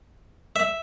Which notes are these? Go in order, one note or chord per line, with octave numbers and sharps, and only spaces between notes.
E5